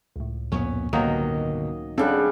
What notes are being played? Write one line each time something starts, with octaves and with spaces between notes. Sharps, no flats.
C#2 A2
F2 A#2 B3 C#4
G1 B2 D#3 F#3 A#3 D#5
C#3 G3 C4 D4 A4 F#5